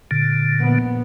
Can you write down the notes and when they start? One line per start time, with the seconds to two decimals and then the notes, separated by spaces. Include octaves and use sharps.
0.11 A#2 D3
0.59 A#1 B3